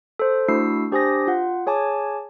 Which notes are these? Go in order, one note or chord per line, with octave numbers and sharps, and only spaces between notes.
A4 C5
A3 D4 E4 F#4 E6 C7
D4 G4 C5 G#5 D#6 A#6
F4 F#5
G#4 C#5 G#5 A5 D6